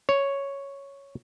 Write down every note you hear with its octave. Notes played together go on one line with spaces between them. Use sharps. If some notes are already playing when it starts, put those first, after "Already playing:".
C#5